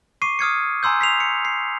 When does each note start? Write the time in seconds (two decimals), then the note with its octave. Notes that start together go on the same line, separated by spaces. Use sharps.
0.22 C#6 D6 C7 D#7
0.39 D#6 F6 G#6 C#7
0.83 G#5 A#5 C6 E6 G6
1.01 B6 C7 F7
1.20 C#7
1.45 C7